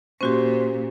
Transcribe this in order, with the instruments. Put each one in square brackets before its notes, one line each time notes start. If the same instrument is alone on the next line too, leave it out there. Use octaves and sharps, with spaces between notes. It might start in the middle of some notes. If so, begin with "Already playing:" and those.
[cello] A#2 [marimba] C#4 F#4 G4 [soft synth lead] C5